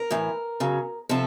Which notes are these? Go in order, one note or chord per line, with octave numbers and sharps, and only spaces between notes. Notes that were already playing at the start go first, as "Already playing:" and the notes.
Already playing: A#4
A2 E3
C#3 F#3
C3 F3 A4